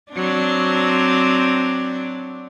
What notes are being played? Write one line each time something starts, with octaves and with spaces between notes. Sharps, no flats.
F#3 C4 D4